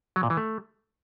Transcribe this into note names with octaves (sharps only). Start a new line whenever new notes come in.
F#3
A#2
E3
A3